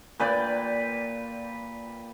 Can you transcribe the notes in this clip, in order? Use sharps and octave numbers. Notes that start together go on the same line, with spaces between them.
A#2 B4 D5 G5